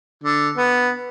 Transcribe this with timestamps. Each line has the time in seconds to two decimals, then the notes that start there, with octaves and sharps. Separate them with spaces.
0.24 D3
0.57 B3